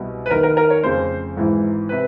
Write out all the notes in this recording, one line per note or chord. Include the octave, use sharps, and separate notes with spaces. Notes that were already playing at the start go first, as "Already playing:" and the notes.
Already playing: C2 B2
B4
D#2 D#3 A#4
A#4
A#4
C#5
F1 F2 C#3 C5
G#1 G#2 E3
C3 B4